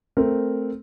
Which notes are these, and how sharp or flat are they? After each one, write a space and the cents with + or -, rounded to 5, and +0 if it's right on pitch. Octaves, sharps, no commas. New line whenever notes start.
A3 +0 C4 +0 A#4 +0